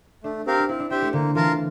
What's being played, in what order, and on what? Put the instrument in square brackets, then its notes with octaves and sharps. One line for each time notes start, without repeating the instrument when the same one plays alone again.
[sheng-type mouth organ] A3 [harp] D4
[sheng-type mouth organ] C4 G4 A#4 F5
[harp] D4
[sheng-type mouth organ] C4 [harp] E4
[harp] D4
[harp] C4 [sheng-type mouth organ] G4 C5 E5 G5
[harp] A3
[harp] D3 [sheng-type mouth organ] A#3
[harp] E3 [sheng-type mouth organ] F4 A#4 F5 A5